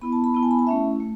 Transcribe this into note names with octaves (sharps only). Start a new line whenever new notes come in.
B3 E4 B5
A5
B5
B3 E4 A5
G#5
B5
A5
A3 C#4 E4 E5
A3